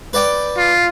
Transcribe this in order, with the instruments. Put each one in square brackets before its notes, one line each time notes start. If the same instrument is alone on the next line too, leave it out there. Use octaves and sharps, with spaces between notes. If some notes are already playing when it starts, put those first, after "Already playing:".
[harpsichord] B4 D5 G5
[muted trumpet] F4